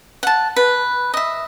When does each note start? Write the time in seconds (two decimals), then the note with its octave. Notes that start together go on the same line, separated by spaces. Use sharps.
0.23 F#5 A5
0.56 B4
1.14 D#5 E5